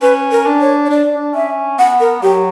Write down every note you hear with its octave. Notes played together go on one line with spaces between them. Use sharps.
C#4 B4
A#4
D4
C#5
C#5
D4 D5
D4
C#4 E5
B3 F#5
A#4
F#3 G4